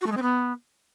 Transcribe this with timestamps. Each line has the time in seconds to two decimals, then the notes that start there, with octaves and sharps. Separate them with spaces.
0.01 F#4
0.06 A3
0.11 G#3
0.16 C4
0.22 B3